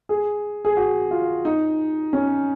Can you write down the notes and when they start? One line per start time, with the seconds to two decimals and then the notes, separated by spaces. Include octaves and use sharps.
0.09 G#4
0.65 G#4
0.77 F#4
1.11 F4
1.45 D#4
2.13 C#4